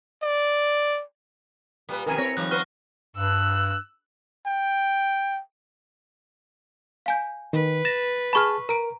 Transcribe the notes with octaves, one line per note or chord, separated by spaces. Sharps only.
D5
A#2 G3 B3 B4
F2 C3 D#3 A#4 G#5
C4 E4 C#5 A#6
G#2 D#3 F3 G3 F#6
B3 B4 C5 C#6 F6 F#6
G2 E6 F#6
G5
F5 G#5 G6
D#3 B4
A6 A#6 E7
G#4 A5 B5 C#6 F6
A#4 A#5 D7